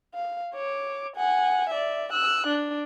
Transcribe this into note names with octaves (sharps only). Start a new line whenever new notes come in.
F5
C#5 D6
F#5 G#5
D5 E5
E6 F#6
D4